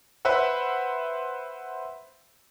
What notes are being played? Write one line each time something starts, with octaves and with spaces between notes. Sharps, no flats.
B4 C5 E5 F#5